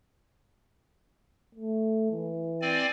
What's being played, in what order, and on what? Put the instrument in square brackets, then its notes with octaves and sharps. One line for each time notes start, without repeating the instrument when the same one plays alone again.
[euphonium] A3
E3
[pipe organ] C4 D5 G#5